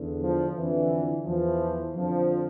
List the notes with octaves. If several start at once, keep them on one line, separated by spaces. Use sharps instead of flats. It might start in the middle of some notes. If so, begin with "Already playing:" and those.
Already playing: E2 D3
F3
F2 D3 E3
E2 E3 F3
F2 D3 F3